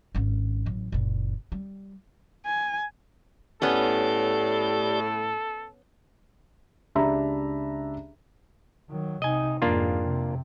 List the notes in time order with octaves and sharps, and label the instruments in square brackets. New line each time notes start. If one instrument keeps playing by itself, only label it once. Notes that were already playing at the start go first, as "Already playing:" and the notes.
[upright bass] G#1 C#4
A1 F#3
F#1 A#2
G3
[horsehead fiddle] G#5
[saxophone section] A2 [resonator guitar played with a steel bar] B3 C#4 [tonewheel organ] G4 D5 [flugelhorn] A4
[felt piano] C#2 D4 G4 E5 A#5 B5
[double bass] D#3 F#3
[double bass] C3 D#4 [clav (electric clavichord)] D#5 G#5
[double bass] F2 G#2 [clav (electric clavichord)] A#3 D4 F4
[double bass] C3